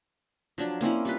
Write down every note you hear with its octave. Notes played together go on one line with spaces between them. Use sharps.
F3 F#3 D4
A#3 C4 C#4 E4
G3 F4 B4